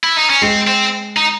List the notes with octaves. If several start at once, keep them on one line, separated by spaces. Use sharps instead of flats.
E4
D#4
C#4
G#3 C4
C4
D#4